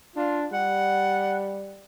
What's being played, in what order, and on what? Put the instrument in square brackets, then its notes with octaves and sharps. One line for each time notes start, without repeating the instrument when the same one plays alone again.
[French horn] D4 [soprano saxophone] F4
[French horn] G3 [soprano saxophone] F#5